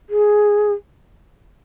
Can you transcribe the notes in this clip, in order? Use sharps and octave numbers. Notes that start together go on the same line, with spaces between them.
G#4